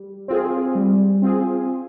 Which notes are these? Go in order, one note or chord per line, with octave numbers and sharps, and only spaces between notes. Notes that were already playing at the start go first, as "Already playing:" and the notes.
Already playing: G3
C4 F4 G#4
G3
C4 F4 G#4